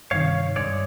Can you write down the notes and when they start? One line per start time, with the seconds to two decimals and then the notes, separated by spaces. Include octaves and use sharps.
0.11 G2 C3 D#3 C#5 F5
0.56 G2 G#3 C#5 D5